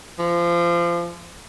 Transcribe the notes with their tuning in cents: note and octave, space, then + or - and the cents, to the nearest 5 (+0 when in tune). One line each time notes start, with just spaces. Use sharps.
F3 -25